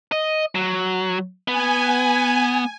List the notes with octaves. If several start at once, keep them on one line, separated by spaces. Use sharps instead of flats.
D#5
F#3
B3 G#5